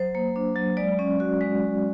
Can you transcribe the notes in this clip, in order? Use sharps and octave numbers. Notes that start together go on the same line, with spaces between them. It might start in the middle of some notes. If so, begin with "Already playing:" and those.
Already playing: F#3 C5
A#3
D4
F#3
G#3 D5
C#4
F#4
G#3